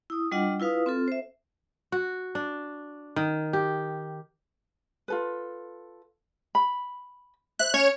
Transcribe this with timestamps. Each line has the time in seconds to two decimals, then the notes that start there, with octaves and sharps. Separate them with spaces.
0.10 E4 D#6
0.32 G3 D4 F4 D#5 F#5
0.60 E4 F4 B4 F5 D#6
0.86 C4 F4 A4
1.08 C5 E5
1.92 F#4
2.35 D4
3.16 D#3
3.53 G4
5.08 F4 A4 B4
6.55 B5
7.59 C5 E5 F#6
7.74 C#4 C#5